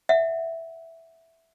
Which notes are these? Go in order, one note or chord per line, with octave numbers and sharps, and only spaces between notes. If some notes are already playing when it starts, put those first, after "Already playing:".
E5 F#5